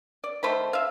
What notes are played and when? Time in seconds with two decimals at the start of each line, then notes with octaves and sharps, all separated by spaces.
0.24 D5
0.43 D#3 A3 C5 B5
0.73 E5 F5